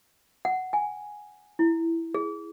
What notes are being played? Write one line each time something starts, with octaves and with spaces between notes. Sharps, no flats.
F#5
G#5
E4
G#4